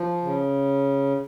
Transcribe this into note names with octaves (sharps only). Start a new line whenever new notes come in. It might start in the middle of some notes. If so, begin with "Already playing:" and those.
Already playing: F3
C#3